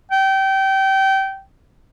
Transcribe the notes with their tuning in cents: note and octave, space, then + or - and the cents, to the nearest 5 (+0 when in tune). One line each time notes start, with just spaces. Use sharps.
G5 -25